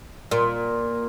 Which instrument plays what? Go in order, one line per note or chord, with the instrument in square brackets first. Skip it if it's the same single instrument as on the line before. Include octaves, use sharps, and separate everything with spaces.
[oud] A#2